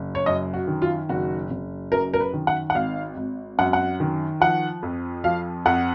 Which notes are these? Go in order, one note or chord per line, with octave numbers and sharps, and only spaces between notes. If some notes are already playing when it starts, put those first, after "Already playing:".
Already playing: F#1
C#5
F#2 D#5
F#4
D#3
F4
F#1 F#4
F#1
F#2 A#4
A#4
B4
D#3
F#5
F#5
G#1 F5
G#1
F#2 F#5
F#5
D#3
F3 F#5
F2
F3 F5
F2 F#5